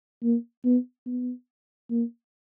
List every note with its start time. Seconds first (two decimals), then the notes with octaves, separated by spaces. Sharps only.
0.23 A#3
0.64 B3
1.06 B3
1.90 A#3